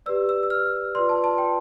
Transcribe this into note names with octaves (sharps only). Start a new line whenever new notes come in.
G4 B4 D5 E6
E6
E6
F6
F4 B4 D5 C6
A5
A5
G5